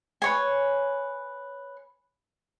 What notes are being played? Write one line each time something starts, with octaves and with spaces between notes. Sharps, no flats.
B4 C#5 G#5